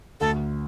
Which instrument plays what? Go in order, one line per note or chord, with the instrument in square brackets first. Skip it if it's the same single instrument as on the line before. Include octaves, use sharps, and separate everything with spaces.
[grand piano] D2 [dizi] A4